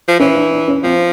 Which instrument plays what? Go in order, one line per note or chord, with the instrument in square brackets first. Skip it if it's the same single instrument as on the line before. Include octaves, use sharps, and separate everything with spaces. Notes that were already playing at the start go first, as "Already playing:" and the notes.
[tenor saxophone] F3
[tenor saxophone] E3 [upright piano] C#4
[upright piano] D4
D4
C#4
[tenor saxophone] F3 [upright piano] C4